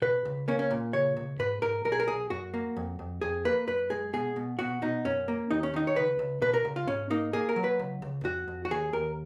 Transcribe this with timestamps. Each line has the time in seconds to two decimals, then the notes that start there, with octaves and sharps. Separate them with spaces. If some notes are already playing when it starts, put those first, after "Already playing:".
0.02 B2 B4
0.25 C#2
0.48 A#3 C#4
0.59 C#4
0.71 A#2
0.93 C#3 C#5
1.17 C#2
1.39 G#2 B4
1.62 G#2 A#4
1.85 B1 A#4
1.92 G#4
2.00 A#4
2.07 B1 G#4
2.30 F#2 F#4
2.54 A#3
2.77 F2
2.99 F2
3.21 F2 G#4
3.45 A#3 B4
3.67 F#2 B4
3.90 G#3 G#4
4.13 B2 G#4
4.36 B2
4.59 B2 F#4
4.82 B2 D#4
5.05 F#2 C#4
5.28 A#3
5.51 D#2 D#4
5.63 C#4
5.74 D#3 D#4
5.87 C#5
5.96 C#2 B4
6.19 C#2
6.42 B2 B4
6.54 A#4
6.65 C#2
6.76 F4
6.88 G#2 C#4
7.10 A#3 D#4
7.33 A#3 G#4
7.49 A#4
7.56 F#3
7.64 B4
7.79 C#2
8.02 C#2
8.25 F2 F#4
8.48 F2
8.65 F#4
8.71 D#2 G#4
8.93 D#2 A#4